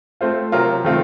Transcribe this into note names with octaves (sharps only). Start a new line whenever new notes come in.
A3 C4 F4 C5
C3 F#3 C4 F4 A#4
D#3 A3 C4 F4